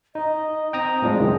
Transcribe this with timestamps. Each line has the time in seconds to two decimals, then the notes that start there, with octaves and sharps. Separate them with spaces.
0.15 D#4 D#5
0.73 C4 G5 A#5 D#6
1.02 A2 F3 G#3 D4
1.19 C#2 F#2 D#3